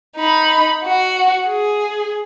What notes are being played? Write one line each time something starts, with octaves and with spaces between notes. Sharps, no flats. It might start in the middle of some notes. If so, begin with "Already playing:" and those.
D#4 B5
F#4
G#4